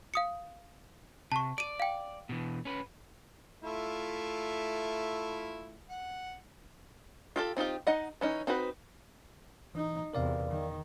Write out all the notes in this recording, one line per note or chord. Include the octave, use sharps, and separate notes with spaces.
F5 D#6 C#7
C3 A5 C#6
D5 D7 D#7
F5 G5
B2 E3
C#4 B4
A3 E4 F4
F#5
F4 G4 A4
C4 D#4 F4 G4
D#4 D#5 F#5
E3 C#4 D#4
C4 D#4 F#4 B4
E3 D#4
E2 C3 A#4 D5 F5
D#3